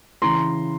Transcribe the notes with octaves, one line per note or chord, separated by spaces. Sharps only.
C#3 E3 A#5 C6